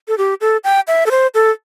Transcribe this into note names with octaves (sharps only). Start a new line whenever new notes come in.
A4
G4
A4
G5
E5
A4
C5
A4